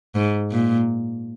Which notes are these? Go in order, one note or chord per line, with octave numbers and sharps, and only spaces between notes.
G#2
A#2